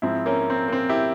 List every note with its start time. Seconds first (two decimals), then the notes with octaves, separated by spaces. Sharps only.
0.02 G#2 F3 G#3 C4 E4
0.26 A#3 C#4
0.50 C4
0.68 A#3
0.72 C4
0.89 E4 G4